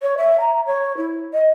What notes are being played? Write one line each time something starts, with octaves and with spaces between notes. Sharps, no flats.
C#5
E5
A#5
C#5
E4
D#5